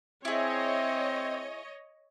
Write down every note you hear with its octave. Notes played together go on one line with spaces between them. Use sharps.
C4 E4 G#4 C#5 D#5